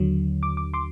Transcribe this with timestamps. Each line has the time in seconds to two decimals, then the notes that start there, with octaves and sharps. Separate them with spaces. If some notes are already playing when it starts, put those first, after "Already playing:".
Already playing: D#2 D3 F#3
0.43 D6
0.57 D6
0.74 C6 D6